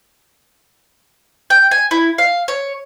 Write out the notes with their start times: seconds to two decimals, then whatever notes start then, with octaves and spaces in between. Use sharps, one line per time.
1.50 G5
1.71 G#5
1.91 E4
2.18 F5
2.48 C#5